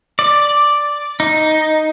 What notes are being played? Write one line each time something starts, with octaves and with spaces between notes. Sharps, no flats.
D5
D#4